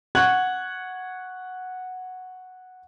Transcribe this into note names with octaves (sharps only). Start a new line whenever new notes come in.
F#5 C#6 F#6 G#6 F#7